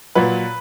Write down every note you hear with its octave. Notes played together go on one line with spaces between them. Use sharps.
A#2 F#3 B4